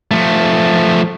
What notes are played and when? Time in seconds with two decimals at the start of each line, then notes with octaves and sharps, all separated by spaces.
0.11 F3 A3